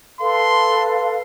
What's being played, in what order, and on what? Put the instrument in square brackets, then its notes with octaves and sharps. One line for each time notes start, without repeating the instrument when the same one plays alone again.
[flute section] A4 B4 F5 [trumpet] C6